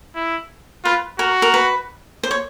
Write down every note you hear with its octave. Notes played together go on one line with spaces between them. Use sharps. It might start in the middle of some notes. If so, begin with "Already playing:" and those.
E4
F4 B4
F#4 A#4
A#4
B4
C5
C#5